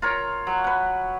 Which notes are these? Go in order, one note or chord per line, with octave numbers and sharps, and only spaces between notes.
F4 A#4 C#5
F#3
B4 F#5